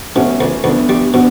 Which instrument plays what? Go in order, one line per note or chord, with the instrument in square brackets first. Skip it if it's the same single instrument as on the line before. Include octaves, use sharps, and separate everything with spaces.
[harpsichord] B2 [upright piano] A3 C#4
[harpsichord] C#2
[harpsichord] C#2 [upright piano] B3 D4
[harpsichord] G3
[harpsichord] B2 [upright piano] B3 D4